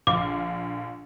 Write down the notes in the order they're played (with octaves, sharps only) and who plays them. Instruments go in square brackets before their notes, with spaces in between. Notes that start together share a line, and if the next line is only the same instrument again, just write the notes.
[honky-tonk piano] A#1 D3 F5 [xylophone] D6